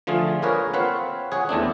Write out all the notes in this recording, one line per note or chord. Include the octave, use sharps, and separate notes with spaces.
D3 F3 A3 F4 G#4
A#3 G#4 A#4 B4 C#5
C4 F4 B4 C#5 F5 F#5
G#4 C#5 F#5
E2 A3 C4 D4